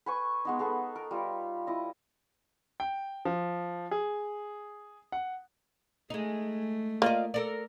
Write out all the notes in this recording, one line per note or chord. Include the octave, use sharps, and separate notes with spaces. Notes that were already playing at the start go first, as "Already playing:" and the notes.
B4 G#5 C#6
G#3 B3 D#4
B3 G#4 A4
A#4
G3 F4 B4
E4 D#5
G5
F3
G#4
F#5
G#3 A3 D#4
A#3 F4 D5 D#5
A4 A#4 D5